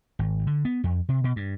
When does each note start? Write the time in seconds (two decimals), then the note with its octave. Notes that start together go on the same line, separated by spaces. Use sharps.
0.19 G#1
0.47 D3
0.65 B3
0.84 F2
1.09 C3
1.24 B2
1.36 G2